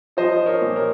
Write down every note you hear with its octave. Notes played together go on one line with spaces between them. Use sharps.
F3 C5 D#5
A#4 C#5
A#2
A#4 C#5